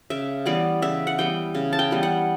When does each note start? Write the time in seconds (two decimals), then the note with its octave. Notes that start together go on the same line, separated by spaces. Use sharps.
0.10 C#3 E5
0.46 E3 G3 B3 D5
0.82 C#3 E5
1.07 F#5
1.18 E3 G3 B3 G5
1.55 C#3
1.73 A5
1.79 G5
1.91 E3 G3 B3
2.03 F#5